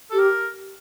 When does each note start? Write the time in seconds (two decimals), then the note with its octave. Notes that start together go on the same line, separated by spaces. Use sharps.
0.11 G4 A4
0.19 A#4